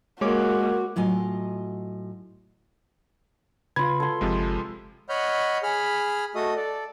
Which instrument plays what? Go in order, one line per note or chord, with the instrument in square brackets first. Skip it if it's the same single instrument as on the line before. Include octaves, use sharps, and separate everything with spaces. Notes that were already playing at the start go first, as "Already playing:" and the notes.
[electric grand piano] G#3 C#5 D6 [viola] A#3 [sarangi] F#4
[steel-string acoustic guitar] A2 F#3 F4 D#5 G#5
[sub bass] C#3 [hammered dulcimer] F4 B4 [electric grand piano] G#6
[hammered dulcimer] A4 C6
[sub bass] G1 [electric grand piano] C3 F3 G#3
[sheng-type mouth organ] C#5 D#5 F#5 B5 F6 G6
G#4 B5 F6
A3 F#4 A4 D#5 D#6
A4 D5